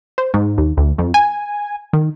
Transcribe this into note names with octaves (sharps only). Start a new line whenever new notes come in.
C5
G#2
D#2
D2
F2
G#5
D#3